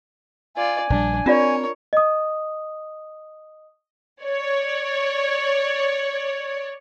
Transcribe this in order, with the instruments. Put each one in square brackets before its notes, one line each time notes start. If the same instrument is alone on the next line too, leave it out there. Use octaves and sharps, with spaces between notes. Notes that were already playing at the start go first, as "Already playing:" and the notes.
[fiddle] F4 D5 [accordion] G#5
[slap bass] A#1 G3 [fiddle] D4
[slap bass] C4 [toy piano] D4 F4 D5 [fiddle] A#4 C#5
[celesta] D#5 D#6
[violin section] C#5 D5